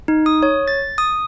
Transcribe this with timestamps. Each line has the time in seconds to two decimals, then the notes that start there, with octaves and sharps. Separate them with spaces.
0.08 D#4
0.26 D#6
0.43 C#5
0.68 A6
0.98 D#6